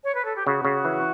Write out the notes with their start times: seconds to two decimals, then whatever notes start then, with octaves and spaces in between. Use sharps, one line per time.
0.03 C#5
0.14 B4
0.25 A4
0.35 G4
0.46 C#3 F#4
0.65 C#3
0.85 E3